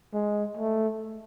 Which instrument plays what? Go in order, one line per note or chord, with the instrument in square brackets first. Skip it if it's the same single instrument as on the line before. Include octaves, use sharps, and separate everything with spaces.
[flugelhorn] G#3
A3